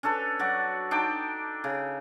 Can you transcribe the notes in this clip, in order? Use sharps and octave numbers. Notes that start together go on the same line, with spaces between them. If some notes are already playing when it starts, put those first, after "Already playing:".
C#4 D4 A4 B4
F#3 F#4 D5
D4 D#4 G5 D6
C#3